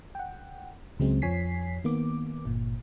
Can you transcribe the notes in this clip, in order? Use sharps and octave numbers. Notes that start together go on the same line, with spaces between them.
F#5 G5
C#2 C#3 F#3 G#3 C4
F2 F3 C#5 G#5 B6 C7
D#3 A#3 B3 D6
G1 A#2